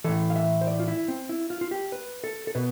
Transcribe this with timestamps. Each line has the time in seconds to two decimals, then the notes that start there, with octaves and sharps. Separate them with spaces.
0.04 A2 E3 A4
0.30 F5
0.36 E5
0.61 C5
0.67 D5
0.79 F4
0.88 E4
1.08 C4
1.29 E4
1.50 F4
1.61 F4
1.71 G4
1.92 B4
2.24 A4
2.47 A4
2.55 B2 B4